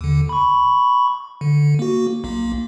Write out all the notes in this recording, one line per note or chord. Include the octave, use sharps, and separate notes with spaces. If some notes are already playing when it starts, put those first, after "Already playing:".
D#2 D3
B5 C#6
D3
A#3 F#4
B1 A#3